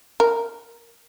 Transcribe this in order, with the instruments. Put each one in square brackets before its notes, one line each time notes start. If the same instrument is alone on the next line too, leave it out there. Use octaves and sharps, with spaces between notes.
[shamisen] A#4